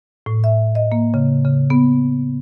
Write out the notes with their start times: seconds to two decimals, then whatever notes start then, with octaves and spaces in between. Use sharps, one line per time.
0.26 A2
0.44 E5
0.75 D#5
0.92 A#3
1.14 C#3
1.45 C#3
1.70 B3